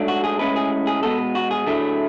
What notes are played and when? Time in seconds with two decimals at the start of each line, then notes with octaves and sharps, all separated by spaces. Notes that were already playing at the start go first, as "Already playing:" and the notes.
Already playing: G#2 F#3 A3 D4
0.08 F#4
0.24 G#4
0.39 A2 G#3 C#4 E4 B4
0.56 G#4
0.87 G#4
1.03 B2 G#3 B3 A4
1.35 F#4
1.51 G#4
1.67 D3 F#3 A3 E4